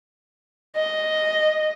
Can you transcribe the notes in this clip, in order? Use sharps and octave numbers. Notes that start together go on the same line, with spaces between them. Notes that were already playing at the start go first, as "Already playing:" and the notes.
D#5